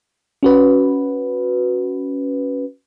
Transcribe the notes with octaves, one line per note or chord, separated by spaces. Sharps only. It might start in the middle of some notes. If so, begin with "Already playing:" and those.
C#4 F#4 B4